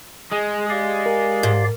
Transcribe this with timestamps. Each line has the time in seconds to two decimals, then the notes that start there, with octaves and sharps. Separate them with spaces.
0.32 G#3 G#4
0.70 G4 D5 F5
1.06 A#4
1.43 G#2